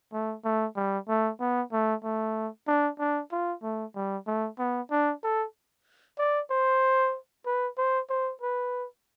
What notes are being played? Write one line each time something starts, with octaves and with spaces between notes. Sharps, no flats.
A3
A3
G3
A3
B3
A3
A3
D4
D4
F4
A3
G3
A3
B3
D4
A4
D5
C5
B4
C5
C5
B4